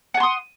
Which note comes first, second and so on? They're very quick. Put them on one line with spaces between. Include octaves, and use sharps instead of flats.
F#5 G#5 C6 D#6